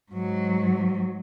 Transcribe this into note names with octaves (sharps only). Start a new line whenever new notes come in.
G#2 F#3